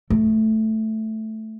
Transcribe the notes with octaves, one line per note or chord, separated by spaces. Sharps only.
A3